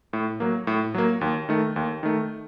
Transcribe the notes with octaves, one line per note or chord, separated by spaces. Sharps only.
A2
F#3 A#3
A2
F#3 A#3
D#2
D#3 A3
D#2
D#3 A3